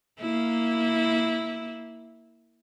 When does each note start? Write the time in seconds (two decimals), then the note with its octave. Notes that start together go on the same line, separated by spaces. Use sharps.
0.20 A#3 E4